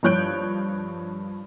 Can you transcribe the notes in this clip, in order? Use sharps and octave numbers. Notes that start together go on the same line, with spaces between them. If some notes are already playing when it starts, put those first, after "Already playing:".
G2 F3 C#5 F#6 G6 D7